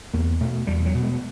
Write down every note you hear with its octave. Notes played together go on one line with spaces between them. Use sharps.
E2 A#3
B2 A3
E2 G3
F#3
B2
G#3